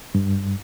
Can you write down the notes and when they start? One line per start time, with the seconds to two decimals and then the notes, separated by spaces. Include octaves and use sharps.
0.15 G2